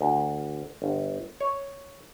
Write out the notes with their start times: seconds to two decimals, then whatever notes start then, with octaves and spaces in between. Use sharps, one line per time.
0.01 D2
0.82 G1
1.41 C#5